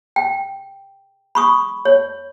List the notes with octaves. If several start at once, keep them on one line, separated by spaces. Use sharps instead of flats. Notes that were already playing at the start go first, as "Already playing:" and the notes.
G5
B5 C#6 D#6
C#5